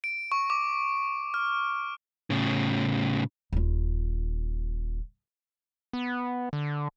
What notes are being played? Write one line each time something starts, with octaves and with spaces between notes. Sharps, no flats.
D7
C#6
D6
F6
A2 C#3
D#1 F4
B3
D3